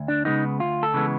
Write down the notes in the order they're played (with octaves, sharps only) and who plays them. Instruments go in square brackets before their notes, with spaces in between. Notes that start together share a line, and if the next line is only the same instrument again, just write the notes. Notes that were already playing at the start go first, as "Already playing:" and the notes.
Already playing: [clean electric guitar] D2
D4
C#3 E3 G#3 B3 D#4
D2 F4
A4
C#3 E3 G#3 B3